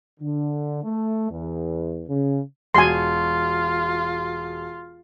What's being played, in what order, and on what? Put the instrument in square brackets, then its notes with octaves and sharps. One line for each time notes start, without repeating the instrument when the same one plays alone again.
[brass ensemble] D3
A3
E2
C#3
[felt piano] E1 F#4 [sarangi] F4 [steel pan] G#5 C6